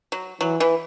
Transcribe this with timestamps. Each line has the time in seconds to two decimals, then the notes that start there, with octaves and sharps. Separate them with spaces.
0.12 F#3
0.41 E3 F#3
0.60 E3